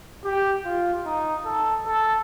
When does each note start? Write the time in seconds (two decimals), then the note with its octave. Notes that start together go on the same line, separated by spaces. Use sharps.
0.25 G4
0.65 F4
1.06 D#4
1.45 A4
1.87 A4